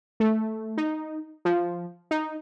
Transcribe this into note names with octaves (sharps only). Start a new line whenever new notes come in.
A3
D#4
F3
D#4